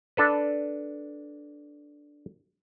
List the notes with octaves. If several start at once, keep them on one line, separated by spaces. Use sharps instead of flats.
D4 A4 B4